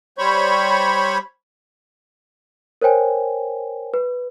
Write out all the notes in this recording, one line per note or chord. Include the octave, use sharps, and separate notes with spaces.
G3 C5 C#5 B5 C#6
A#4 C5 C#5 G5 G#5
B4